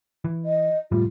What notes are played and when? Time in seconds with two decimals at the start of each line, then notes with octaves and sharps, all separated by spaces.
0.25 E3
0.45 D#5
0.92 F1 A2 G3 F4